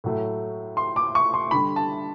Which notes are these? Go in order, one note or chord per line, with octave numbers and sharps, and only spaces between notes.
A2 F#3 A3
C6
D6
C#6
C6
D3 G3 B5
A5